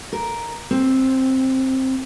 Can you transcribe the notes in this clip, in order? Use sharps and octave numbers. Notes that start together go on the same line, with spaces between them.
A#4
C4